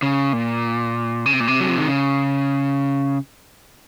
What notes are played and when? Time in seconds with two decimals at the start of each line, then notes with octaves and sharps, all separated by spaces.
0.02 C#3
0.33 A#2
1.26 C#3
1.33 C3
1.40 A#2
1.48 C3
1.60 F#3
1.69 F3
1.78 D#3
1.88 C#3